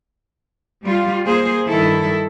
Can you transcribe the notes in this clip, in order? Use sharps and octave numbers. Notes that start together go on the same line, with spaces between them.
G3 F4
A#3 G#4 C5
G2 D#3 E4 A4